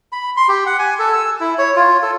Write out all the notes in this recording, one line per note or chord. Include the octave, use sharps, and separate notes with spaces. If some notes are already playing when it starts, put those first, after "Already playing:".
B5
C6
G4
F#5
G#5
A4
E6
E4
C#5
F4
A4